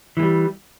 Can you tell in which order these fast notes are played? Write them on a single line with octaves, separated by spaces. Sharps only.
E3 G#3 G3